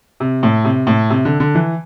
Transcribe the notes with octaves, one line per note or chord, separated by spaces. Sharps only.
C3
A2
C3
A2
C3
D3
D3
E3